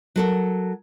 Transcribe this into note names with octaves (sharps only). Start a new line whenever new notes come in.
F#3 A4 A#4